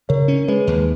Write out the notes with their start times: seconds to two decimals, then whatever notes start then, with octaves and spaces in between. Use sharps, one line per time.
0.09 C#3 A#4 C#5
0.28 C#4
0.48 G#3 G#4 B4
0.67 D#2